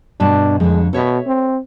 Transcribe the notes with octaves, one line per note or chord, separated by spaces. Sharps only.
G2 B2 D4 A5
F2 D3 G#3
B2 A4 C#5 E5
C4